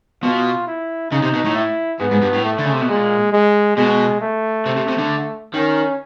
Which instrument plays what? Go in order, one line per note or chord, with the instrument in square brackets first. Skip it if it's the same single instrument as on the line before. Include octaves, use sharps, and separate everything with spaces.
[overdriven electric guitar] B2 [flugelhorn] F4
[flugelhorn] E4
[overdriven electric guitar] C#3 [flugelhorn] D#4
[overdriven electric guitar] C3
B2
A2
[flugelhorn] E4
[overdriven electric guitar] G#2 [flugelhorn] B3
[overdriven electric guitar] G#2
G2
A2
[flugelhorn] A3
[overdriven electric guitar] D3
C#3
C3
B2
[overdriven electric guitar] A#2 [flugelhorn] G#3
[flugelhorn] G#3
[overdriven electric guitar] B2 [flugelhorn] G#3
[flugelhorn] A3
[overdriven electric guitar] C3
C3
C3
D3
[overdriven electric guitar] D#3 [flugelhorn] C#4